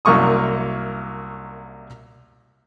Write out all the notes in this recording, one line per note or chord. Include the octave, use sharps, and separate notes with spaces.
C2 F#2 A#3 C#6 D#6